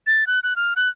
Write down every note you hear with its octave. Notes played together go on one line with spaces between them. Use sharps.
A6
F#6
F#6
F6
F#6